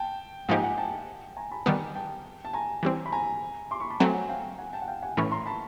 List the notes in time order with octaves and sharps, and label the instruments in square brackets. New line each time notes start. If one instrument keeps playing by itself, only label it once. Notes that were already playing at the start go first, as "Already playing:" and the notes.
Already playing: [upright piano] G5 A5
[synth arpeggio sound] G#2 F3 A#3 D#4 G4 [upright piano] F#5 G#5
[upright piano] F#5 G#5
G5 A5
G#5 A#5
A5 B5
[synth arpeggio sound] D#3 G3 B3 [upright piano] G#5 A#5
[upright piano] G5 A5
A5
G#5 A#5
[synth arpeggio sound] E3 G3 C4
[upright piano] B5
G#5 A#5
C6 D6
B5 C#6
A5 B5
[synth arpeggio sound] F#3 A3 C4 [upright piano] G#5 A#5
[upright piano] F#5 G#5
F5 G5
F#5 G#5
G5 A5
F#5
F5 G5
F#5 G#5
[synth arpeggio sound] A2 E3 A3 C#4 [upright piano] B5 C#6
[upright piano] A#5 C6
A5 B5